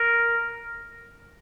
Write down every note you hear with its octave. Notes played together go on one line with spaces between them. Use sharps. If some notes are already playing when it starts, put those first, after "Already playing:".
Already playing: A#4